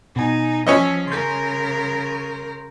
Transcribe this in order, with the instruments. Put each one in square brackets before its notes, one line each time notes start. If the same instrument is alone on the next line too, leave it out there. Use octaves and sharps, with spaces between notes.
[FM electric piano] B2 G#5 [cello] D#4
[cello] F3 [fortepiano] C#4 C#5 D#5 [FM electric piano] E6 B6
[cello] C#3 A#4 [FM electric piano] C6 G6